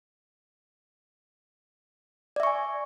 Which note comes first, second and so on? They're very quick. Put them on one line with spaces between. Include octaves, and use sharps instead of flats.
D5 E5 C#6 G#5